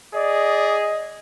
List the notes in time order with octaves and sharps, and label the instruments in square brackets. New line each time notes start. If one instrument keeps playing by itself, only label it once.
[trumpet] G#4 [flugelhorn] D5 [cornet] D#5